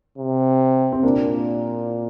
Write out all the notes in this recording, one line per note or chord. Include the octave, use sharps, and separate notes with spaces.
C3
C4
A#2 A#3 D4